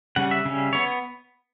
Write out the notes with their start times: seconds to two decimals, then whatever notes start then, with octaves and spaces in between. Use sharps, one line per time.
0.16 C#3 G3 C#4 F#5
0.31 E5
0.45 C#3 G3 C#4
0.73 B3 C#5